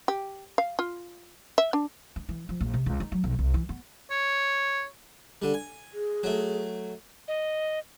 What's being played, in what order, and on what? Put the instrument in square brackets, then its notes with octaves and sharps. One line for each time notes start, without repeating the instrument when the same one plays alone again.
[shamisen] G4
F5
F4
E5
D4
[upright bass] D4
E3
F3
A#1
C3
C#2
D#4
F#3
B1
C2
E3
B3
[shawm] C#5
[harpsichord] D3 G3
G#5
[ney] G#4
[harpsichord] F#3 A3
[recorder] D#5